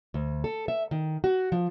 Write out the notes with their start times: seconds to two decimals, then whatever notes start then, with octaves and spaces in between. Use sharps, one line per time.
0.14 D2
0.44 A4
0.68 E5
0.91 D#3
1.24 F#4
1.52 F3